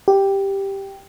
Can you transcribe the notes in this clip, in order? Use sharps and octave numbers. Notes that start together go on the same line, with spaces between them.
G4